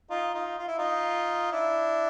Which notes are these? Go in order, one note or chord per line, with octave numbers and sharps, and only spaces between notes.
D#4 F4
D#4 F4
F4
E4
D#4 F4
D4 E4